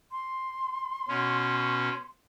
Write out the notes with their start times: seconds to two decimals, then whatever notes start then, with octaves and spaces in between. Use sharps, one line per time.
0.11 C6
1.09 B2 C#4